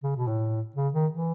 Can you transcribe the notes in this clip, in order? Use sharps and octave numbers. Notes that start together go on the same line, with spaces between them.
C#3
B2
A2
C#3
D#3
E3